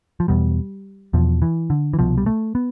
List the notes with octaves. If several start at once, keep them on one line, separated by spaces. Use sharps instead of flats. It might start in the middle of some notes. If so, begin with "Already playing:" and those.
F3
E2 B2 G3
E2 B2 F3
E3
D3
E3
C2 B2 F3
G3
A3
B3